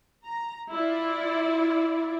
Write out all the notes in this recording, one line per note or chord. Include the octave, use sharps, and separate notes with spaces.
A#5
E4 F4 D5